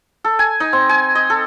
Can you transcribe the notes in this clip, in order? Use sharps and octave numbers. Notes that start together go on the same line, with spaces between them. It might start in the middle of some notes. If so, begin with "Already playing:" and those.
A4
G#5
D#4
C4
G#5
D#5
A4